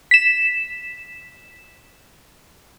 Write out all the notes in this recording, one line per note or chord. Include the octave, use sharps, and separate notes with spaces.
B6 E7